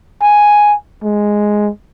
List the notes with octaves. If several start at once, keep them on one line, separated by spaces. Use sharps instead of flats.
G#5
G#3